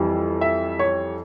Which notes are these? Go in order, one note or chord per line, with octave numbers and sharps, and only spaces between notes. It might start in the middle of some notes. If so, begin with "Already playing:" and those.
Already playing: F2 E3 G3
E5
C#5